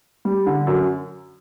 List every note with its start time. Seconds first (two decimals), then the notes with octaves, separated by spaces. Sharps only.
0.25 G3
0.46 D3
0.67 F#2